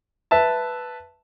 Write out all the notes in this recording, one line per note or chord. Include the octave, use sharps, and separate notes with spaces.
B4 E5 A5